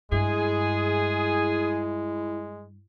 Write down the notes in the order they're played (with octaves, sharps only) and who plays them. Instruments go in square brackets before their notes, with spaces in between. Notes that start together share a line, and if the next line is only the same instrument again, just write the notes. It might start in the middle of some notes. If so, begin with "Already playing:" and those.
[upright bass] G2 [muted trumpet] G#3 [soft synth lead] E4 [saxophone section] G#4